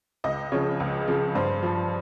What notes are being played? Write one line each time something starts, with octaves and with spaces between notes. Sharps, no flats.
C#2 D#5
C#3 F3 C#5
C#2
C#3 F3
G2 C5
F3